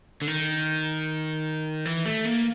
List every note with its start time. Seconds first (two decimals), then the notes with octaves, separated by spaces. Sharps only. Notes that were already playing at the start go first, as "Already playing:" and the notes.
0.22 D3
0.27 D#3
1.85 E3
2.06 A3
2.25 A#3